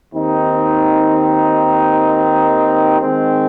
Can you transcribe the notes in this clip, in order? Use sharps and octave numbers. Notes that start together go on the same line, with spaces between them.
D#2 D#3 C4 D#4
D#3 G#3 C4